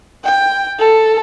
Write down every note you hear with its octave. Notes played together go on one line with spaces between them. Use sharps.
G5
A4